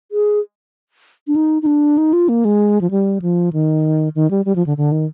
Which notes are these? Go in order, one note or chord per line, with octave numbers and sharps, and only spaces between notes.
G#4
D4
D#4
D#4
D4
D#4
F4
A#3
G#3
F3
G3
F3
D#3
D#3
G3
G3
F3
D3
D3
D#3